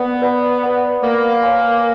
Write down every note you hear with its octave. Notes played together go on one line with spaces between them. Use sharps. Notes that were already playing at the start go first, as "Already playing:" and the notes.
Already playing: B3 B4 D5 F#5 B5
B4 D5 F#5 B5
B4 D5 F#5 B5
A#3 B4 D5 F#5 B5
C#5 F5 G#5 C6